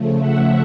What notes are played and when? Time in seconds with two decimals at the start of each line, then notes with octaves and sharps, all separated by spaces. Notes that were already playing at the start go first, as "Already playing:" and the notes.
Already playing: C#3 F3 A3
0.19 E5 F#5